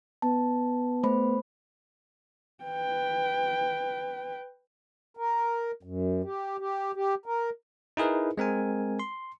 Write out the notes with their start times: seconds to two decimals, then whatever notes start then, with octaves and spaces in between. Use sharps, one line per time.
0.22 B3 A5
1.03 A3 C5 B5
2.65 B4 G5
5.17 A#4
5.83 F#2
6.24 G4
6.59 G4
6.95 G4
7.26 A#4
7.97 D#4 E4 G#4 A#4 B4
8.38 G#3 C4 A#4 G#5
8.99 C6